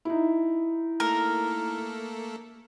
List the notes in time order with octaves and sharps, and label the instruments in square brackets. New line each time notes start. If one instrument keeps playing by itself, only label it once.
[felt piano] D#4 E4
[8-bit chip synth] A3 A#3 A4 [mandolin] A#4